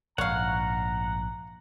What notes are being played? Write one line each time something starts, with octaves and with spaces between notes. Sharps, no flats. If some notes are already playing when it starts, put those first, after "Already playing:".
A#1 G#2 C#5 F5 F#5 A#5